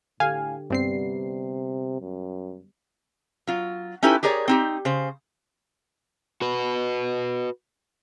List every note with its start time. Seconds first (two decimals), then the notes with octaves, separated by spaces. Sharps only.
0.20 A2 D3 G4 F5 G#5
0.70 G2 C3 G3 B3 C4 C7
2.01 F#2
3.47 F#3 F4
4.03 C#4 D#4 E4 G4 A4 B4
4.23 G4 G#4 A#4 C#5 D5
4.48 C4 D#4 G4
4.85 C#3 C5
6.42 F#4 B4